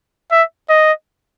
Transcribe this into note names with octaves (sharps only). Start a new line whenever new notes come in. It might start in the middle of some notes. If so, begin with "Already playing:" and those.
E5
D#5